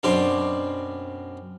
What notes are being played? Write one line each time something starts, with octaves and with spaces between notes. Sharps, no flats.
F#2 B2 C4 D4 D5